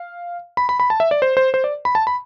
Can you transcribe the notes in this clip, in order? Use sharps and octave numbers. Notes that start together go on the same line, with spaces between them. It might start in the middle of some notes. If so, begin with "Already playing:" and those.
Already playing: F5
B5
B5
B5
A5
E5
D5
C5
C5
C5
D5
B5
A5
B5